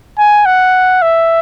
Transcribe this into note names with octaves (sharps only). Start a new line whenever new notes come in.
G#5
F#5
E5